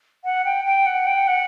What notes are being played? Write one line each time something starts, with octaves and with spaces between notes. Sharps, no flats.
F#5
G5
G5
F#5
G5
F#5